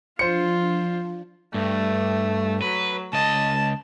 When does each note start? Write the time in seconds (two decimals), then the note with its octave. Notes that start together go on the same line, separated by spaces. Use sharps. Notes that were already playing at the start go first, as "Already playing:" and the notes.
0.19 F3 D4 F4 C5 C#7
1.54 G2 A3
2.62 F#3 B4
3.13 C#2 D#5 A5